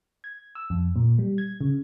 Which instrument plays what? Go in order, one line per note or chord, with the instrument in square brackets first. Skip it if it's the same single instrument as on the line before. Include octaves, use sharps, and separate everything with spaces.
[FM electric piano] G#6
E6
F2
A#2
G3
G#6
C#3